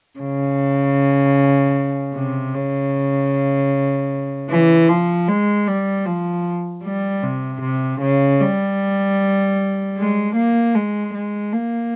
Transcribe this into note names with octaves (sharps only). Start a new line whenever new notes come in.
C#3
C3
C#3
E3
F3
G#3
G3
F3
G3
C3
C3
C#3
G3
G#3
A#3
G#3
G#3
A#3